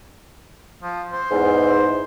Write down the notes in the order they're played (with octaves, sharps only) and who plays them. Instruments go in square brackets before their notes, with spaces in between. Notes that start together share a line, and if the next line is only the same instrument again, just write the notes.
[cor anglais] F3
C5
[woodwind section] E2 G#2